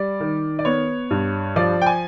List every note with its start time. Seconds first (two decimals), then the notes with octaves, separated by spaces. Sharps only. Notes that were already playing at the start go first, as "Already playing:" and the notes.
Already playing: G3 D5
0.20 D#3
0.59 D5
0.65 B3 C#5
1.11 G2
1.56 F3 D5
1.81 G5
1.86 G#5